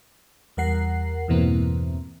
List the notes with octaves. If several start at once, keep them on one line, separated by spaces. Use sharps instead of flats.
E2 G3 A#4 F#5 C7
E2 G2 B2 E3 A#3 C4